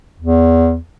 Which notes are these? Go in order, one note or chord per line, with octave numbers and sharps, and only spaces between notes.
E2